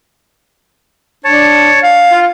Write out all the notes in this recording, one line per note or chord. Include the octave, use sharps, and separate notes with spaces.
D4 C#5 A5
F5
F4